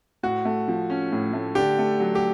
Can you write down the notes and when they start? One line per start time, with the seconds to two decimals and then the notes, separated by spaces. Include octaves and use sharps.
0.23 A2 F#4
0.45 A3
0.68 F3
0.90 C#4
1.12 A2
1.33 A3
1.55 D3 G4
1.78 A3
2.00 F#3
2.15 G4